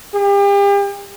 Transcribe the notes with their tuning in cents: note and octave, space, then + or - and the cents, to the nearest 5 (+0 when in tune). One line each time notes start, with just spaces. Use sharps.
G4 +40